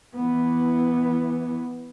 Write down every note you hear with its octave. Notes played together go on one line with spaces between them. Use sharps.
E3 B3